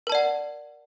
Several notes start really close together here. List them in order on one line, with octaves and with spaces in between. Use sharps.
A#4 A5 D5 F#5